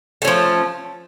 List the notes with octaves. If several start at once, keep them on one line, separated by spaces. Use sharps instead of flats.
F3 A3 C#4